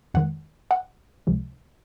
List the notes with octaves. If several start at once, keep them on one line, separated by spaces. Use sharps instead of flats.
F2 D#3 G#3 F#5
F#5
C#2 C3 F3 G#3